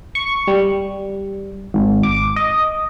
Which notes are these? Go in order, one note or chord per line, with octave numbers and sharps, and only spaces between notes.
C#6
G3
G#1
D6
D#5